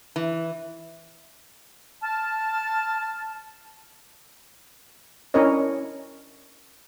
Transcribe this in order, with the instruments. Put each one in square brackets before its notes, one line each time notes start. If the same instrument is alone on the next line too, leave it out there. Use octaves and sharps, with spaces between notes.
[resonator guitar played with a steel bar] E3
[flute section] A5 F6
[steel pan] C#4 D4 E4 A#4 C#5 D#5